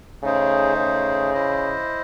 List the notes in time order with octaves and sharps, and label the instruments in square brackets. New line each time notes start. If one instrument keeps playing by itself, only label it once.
[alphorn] C#3 [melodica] A3 D#4 G#4 C5
[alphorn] C#3
[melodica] E4 C5 D#5